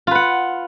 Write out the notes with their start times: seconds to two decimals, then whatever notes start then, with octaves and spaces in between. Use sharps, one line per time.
0.07 F4
0.11 B4
0.15 F#5